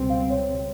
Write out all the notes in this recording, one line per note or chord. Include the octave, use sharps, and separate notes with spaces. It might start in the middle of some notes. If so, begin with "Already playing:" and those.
Already playing: C#2 B2 G3 C4
F5
C#5